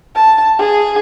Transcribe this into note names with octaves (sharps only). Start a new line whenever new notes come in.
A5
G#4